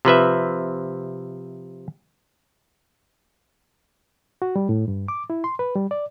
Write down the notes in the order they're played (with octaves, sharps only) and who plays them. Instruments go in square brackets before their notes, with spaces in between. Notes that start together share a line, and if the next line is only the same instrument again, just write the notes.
[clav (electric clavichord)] C3 F3 B4 E5
[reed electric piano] F#4
G3
A2
G2
D6
E4
C6
B4
G3
D5